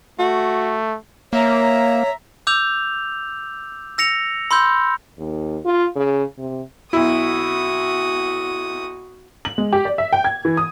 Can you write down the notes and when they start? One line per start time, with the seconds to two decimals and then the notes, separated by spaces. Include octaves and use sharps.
0.19 A3 F#4
1.33 A#3 C#5 E5 A#5
2.47 D6 E6 G6 F7
3.98 E6 A#6 C#7 F7
4.51 B5 C6 E6 G6
5.18 D#2
5.65 F4
5.96 C#3
6.38 C3
6.93 B1 E4 F#4 D#6
9.45 F#7
9.58 G#3
9.73 G4
9.85 D5
9.98 E5
10.13 G5
10.24 G#6
10.45 E3
10.57 D#6